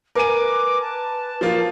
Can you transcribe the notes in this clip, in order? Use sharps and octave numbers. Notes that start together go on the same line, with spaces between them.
A#4 B4 G#5 D6 D#7
A5
F3 A#3 F4